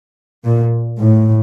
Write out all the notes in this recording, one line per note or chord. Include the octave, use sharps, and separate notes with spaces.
A#2
A2